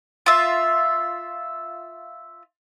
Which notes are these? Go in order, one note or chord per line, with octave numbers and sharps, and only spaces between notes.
F4 E5